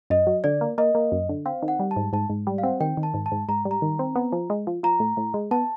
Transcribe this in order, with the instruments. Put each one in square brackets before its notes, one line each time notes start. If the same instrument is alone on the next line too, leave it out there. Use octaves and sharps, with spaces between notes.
[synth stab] F#2 [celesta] D#5
[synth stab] F#3
[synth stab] D3 [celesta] D5
[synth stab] A#3
[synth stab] A#3 [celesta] D#5
[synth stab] A#3
F#2
D3
[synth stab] C4 [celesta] F5
[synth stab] D#3
[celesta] F#5
[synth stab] G3
[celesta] A5
[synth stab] G#2
[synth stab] G#2 [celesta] A5
[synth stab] G#2
G3
[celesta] F5
[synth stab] C4 [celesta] F#5
[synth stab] D#3 [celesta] G5
[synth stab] D#3
[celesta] A5
[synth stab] G#2
[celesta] A5
[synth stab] G#2
[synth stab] G#2 [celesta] A#5
[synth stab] G3
[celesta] A#5
[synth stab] D#3
C4
B3
F3
G#3
F3
[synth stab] F3 [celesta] A#5
[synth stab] A2
A2
G#3
[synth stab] B3 [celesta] A5